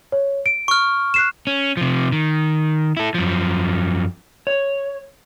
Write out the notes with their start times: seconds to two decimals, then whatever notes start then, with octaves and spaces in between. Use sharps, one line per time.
0.12 C#5
0.46 D7
0.68 C#6 F6
1.14 F#6 C7 E7
1.47 C#4
1.77 C3 F3
2.12 D#3
2.97 E4 A4
3.14 F#2 F3
4.47 C#5